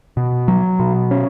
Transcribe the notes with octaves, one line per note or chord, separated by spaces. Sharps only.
B2
F#3
B2
C#4